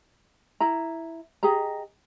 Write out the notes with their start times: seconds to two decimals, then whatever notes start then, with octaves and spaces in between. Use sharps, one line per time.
0.60 E4 A#5
1.43 G4 G#4 D#5 A#5